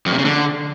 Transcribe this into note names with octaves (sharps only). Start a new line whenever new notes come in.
F2
C3
C#3
D3